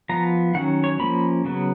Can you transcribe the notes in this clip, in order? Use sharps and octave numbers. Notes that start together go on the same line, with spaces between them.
F3 B3 A#5
D#3 F#3 C#4 F#5
C#5
F3 A#3 C#4 B5
C#3 F#3 B3